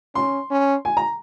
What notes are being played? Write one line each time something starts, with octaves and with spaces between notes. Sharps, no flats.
C#4 C6
C#4
G#5
A#5